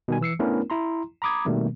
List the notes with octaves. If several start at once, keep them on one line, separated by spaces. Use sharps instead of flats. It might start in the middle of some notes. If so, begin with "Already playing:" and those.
B2 D#3 G3 G#5
E3 E6 C7 C#7
A3 B3 C#4 D4 E4 A#4
E4 A#5 C6
A#5 B5 D6 D#6 G#6
B2 D#3 G3 A3 A#3 C4